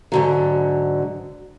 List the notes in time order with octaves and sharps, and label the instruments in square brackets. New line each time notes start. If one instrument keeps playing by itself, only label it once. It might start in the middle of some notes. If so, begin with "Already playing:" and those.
[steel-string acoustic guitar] G#2 D3 F#3